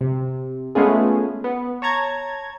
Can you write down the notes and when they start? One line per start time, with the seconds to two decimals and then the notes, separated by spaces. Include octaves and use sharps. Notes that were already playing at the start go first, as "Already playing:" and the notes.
0.01 C3
0.75 G#3 A3 B3 C#4 F4 G#4
1.44 B3
1.82 C#5 A5 A#5 G#6